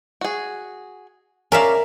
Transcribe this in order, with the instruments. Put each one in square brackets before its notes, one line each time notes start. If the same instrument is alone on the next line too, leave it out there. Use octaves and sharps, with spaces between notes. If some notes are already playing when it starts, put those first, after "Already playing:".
[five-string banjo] F#4 G#4
[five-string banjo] C#4 D5 [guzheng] A#4 E5 F5